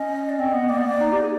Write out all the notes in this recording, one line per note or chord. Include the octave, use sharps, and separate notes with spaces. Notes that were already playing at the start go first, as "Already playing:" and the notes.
Already playing: C#4 D#5
D5
C4 D#5
B3
A#3 D5
B3
A#3
D#4
G4
G#4